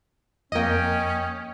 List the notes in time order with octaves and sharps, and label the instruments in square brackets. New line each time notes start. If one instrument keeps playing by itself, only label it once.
[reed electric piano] F2 A#3 [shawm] C#4 [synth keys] D#5 G5